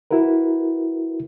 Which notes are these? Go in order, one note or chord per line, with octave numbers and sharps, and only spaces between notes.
E4 F#4 A#4 B4